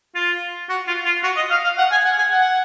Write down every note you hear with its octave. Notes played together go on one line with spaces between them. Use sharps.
F4
F#4
F4
F4
F#4
D#5
F5
F5
F#5
G#5
F#5
G#5
F#5